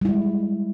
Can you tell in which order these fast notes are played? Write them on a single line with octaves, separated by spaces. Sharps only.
G3 E4 G#3